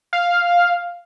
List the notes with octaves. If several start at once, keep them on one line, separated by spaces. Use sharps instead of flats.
F5